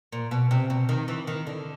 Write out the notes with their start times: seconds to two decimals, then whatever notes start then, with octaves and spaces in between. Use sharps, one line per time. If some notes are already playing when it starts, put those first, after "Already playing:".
0.12 A#2
0.31 B2
0.51 C3
0.70 B2
0.89 D#3
1.08 E3
1.27 D#3
1.47 D3